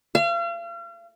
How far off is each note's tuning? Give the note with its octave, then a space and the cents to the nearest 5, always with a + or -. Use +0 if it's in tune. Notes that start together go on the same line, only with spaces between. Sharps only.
F5 -40